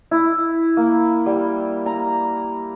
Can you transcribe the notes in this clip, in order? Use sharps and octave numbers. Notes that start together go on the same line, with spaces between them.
E4
A#3
G3
A#5